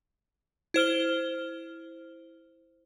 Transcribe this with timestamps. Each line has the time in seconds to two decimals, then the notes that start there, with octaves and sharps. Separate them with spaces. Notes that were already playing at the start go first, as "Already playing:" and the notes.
0.74 E4 C5 F6 G7